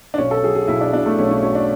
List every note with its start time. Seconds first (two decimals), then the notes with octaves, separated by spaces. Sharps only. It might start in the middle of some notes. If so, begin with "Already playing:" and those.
0.14 D4
0.18 B1 C#4
0.31 A4
0.43 F#3 G#4
0.55 G#4
0.68 B1 E4
0.81 D4
0.93 B2 D4
1.06 A3
1.19 B1 C#4
1.31 C#4
1.43 F#3 C#4
1.55 D4